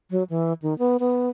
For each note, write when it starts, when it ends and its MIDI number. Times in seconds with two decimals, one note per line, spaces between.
0.11 0.23 54
0.30 0.53 52
0.62 0.77 51
0.79 0.97 59
1.00 1.29 59